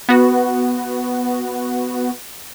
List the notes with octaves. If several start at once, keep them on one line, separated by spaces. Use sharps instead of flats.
B3 F#4